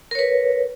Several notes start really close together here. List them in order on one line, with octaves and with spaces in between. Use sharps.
A#4 C#5 B4